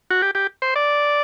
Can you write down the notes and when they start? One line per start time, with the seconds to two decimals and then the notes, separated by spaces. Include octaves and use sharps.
0.11 F#4
0.22 G4
0.35 G4
0.62 C5
0.76 D5